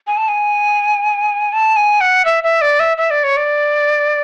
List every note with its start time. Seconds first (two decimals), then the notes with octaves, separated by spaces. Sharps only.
0.07 G#5
0.17 A5
0.28 G#5
1.53 A5
1.76 G#5
2.01 F#5
2.25 E5
2.44 E5
2.61 D5
2.80 E5
2.98 E5
3.10 D5
3.24 C#5
3.37 D5